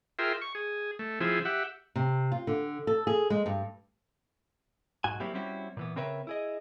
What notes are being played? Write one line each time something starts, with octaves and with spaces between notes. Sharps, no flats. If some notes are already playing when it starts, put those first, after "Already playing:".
F4 G#4 A#4 E5 G5 C6
C#6
G#4
A3
F3 C4 E4 G#4
G4 E5 F#5
C3
F4
D3
A4
G#4
G#3
G2
B1 G#2 F#4 G#5
F#3 G3 A#3 C4 E4 G4
G3 C4 C#4 E4 F#4
A#2 E3 B3
C#3 C4 A#4 B4 C#5 E5
E4 G#4 D#5